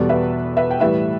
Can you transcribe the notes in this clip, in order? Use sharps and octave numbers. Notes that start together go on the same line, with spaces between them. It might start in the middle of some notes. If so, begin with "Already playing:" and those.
Already playing: E2 B2 G3 A4 D5
B4 E5
B4 E5
G5
A2 E3 G3 B4 E5